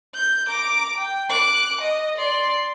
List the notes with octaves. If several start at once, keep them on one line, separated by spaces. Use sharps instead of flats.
G6
A#5 D6
G5
D6 F#6
D#5
D5 C6